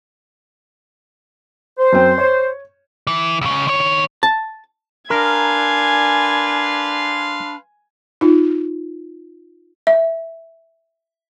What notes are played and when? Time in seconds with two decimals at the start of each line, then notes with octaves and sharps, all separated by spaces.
1.79 C5
1.93 F#2 C4
2.18 C#5
3.07 E3
3.41 C#2 C#3
3.68 D#3 C#5
4.23 A5
5.10 D4 A#4 B4 F5 G#5 C6
8.21 D#4 F4
9.87 E5